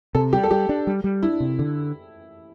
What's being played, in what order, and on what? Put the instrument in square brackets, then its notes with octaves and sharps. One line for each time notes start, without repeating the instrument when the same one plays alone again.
[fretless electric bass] C3 [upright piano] A4
[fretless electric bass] G3 [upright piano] G4
[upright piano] A4
[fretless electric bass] G3 [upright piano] G4
[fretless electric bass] D4
G3
G3
[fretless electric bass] D4 [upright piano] E4
[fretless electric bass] C3
D3